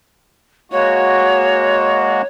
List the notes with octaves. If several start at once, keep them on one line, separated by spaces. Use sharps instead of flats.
G#3 A#3 F#4 C#5